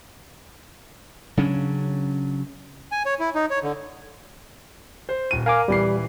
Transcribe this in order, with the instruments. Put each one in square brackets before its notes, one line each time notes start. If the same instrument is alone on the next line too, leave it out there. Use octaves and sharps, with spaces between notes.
[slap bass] C#3 F#3 C#4 D4
[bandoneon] G#5
C#5
E4
D#4
C#5
D3
[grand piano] C5
D#1 D#7
[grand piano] A#4 [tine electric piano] F5 G#5 D6
[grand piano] D#1 E3 C7 [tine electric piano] G3